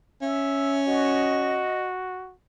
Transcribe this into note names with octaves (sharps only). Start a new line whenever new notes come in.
C#4 E5
F#4 D#5